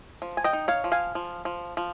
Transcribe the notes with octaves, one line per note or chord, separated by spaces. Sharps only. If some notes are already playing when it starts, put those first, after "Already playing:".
F3
G#5
D#5 G5
D#4
C#5 F5
F3
F5 G#5
F3
F3
F3